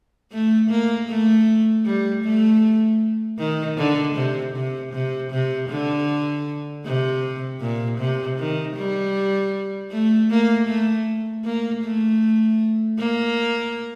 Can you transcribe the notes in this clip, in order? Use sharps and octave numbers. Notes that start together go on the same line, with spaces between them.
A3
A#3
A3
G3
A3
D#3
D3
C3
C3
C3
C3
D3
C3
A#2
C3
D#3
G3
A3
A#3
A3
A#3
A3
A#3